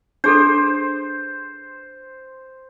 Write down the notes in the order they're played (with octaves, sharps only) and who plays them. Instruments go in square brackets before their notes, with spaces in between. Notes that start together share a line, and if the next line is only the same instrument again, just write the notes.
[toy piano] D4 G#4 A4 [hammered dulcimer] C5